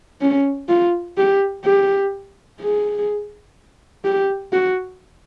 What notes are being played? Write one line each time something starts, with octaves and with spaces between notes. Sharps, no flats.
C#4
F4
G4
G4
G#4
G4
F#4